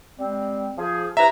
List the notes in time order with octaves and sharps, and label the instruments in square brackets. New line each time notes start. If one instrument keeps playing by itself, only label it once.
[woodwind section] G3 G#3 C4
F3 G#4
[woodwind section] C3 E4 B4 [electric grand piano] E5 [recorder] A#5